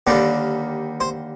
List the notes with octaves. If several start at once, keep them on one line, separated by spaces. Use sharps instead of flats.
D#2 D3 G3 A#3 D5
C5